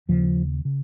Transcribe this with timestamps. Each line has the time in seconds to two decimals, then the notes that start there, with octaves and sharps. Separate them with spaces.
0.09 D#2 C#3 F3
0.65 C#3